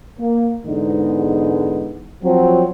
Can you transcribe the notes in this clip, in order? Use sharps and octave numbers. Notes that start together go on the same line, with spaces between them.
A#3
E2 G#2 D3 G#3 B3 D#4
F3 F#3 C4